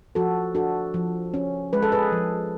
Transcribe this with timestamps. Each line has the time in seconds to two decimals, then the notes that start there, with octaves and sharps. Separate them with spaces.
0.15 F3 F#4 A4
0.54 D4 F#4 A4
0.94 F3
1.34 C#4
1.73 G#3 B4
1.83 A4
1.92 G#4 B4
2.12 F3